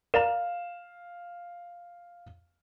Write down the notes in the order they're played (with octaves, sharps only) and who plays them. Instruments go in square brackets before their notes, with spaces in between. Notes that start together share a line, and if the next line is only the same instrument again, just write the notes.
[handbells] A#4 D5 A#5 [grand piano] F5 E7